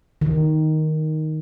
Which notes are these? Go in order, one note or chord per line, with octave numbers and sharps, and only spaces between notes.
D#3